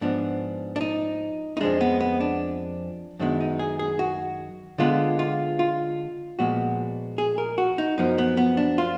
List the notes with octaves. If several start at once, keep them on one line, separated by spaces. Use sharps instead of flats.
G#2 F3 B3 D4
D4
D#4
D#4
F2 F3 G#3 D4
B3
B3
D4
F#2 D#3 G#3 B3 D4
D#4
G#4
G#4
F#4
D3 G#3 B3 F4
F4
F4
A#2 F3 G#3 B3 F#4
G#4
A#4
F#4
D#4
F#2 F3 B3 D#4
B3
B3
D4
F4